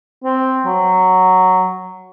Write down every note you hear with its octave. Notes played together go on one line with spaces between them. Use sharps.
C4
F#3